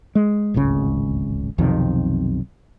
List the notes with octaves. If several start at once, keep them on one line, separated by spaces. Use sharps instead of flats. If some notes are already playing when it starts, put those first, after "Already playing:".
G#3
D1 G#1 C#2 C#3
B1 F2 C3 D#3